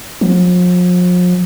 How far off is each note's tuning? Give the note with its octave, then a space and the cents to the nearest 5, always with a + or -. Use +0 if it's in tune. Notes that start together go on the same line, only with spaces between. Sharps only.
F3 +40